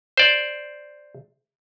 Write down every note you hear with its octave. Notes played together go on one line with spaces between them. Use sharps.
C5 D5